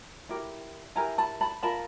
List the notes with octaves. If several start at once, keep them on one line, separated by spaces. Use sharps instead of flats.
E4 G4 A#4
E4 G4 A#4 G#5 A#5
A5 B5
A5 B5
F4 A#4 A5 B5